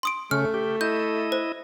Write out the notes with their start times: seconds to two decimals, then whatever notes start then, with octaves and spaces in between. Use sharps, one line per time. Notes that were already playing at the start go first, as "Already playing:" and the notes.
0.03 C6 D#6 D7
0.31 C#3 A3 C#4 F6
0.54 G4
0.81 E4 D#5 G6
1.32 C5